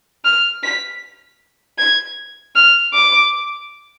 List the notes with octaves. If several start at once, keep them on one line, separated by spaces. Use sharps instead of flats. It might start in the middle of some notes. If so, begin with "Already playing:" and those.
F6
B6
G#6
F6
D6